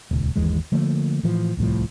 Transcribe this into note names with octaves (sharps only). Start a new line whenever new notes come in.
D#1 C#2
G1 D#2 E3 G#3
D3 F3 A3 A#3
A2 E3 F3
D1 C2 A2 F3